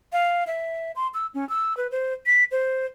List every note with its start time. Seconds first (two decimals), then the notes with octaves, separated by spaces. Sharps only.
0.13 F5
0.47 E5
0.96 C6
1.14 E6
1.34 C#4
1.49 E6
1.77 B4
1.91 C5
2.26 B6
2.51 C5